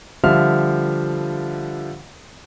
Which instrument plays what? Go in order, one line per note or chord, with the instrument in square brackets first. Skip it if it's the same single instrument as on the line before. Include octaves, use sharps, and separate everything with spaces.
[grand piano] D3 F3 G3 E5 F5 F6